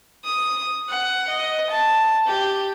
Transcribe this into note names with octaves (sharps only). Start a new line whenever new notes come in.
D#6
F#5
D#5
A5
G4